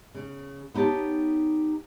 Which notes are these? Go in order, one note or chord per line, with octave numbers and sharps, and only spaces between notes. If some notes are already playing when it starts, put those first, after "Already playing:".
C#3
B3 D#4 G4 C#5 A5